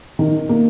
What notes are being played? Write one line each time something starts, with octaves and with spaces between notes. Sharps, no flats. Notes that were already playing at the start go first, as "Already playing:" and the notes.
D#3
A#3